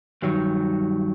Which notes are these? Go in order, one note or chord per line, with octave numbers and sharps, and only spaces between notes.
G2 D#3 F#3